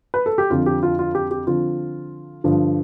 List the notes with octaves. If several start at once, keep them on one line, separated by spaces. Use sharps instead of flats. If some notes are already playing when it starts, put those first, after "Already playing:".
B4
A4
G4
F2 D3 F3 F4
G4
F4
F4
G4
G4
D3 F3 C4 F4
G2 D3 F3